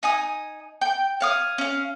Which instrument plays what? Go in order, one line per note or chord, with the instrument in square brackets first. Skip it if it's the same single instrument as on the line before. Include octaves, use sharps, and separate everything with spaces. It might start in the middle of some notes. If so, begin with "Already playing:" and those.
[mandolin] D#4 G#5 D#6
G5
C#5 F5 D#6
C#4 F5